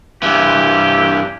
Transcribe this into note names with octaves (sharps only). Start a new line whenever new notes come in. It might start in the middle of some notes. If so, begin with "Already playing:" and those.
G2 E3 G4